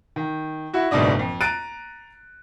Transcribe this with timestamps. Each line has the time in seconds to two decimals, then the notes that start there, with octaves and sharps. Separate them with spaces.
0.16 D#3
0.74 E4 F#4
0.91 F#1 G#2 B2 D4 D#5
1.19 F2
1.41 A#5 F#6 A6 D7 D#7